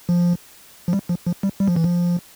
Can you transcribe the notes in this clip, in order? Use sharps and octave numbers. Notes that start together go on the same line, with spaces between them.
F3
F3
G3
F3
F3
G3
G3
F3
E3
F3